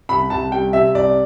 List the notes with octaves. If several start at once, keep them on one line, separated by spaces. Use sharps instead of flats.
C2 B5
C2 A5
G3 G5
C3 E5
C2 D5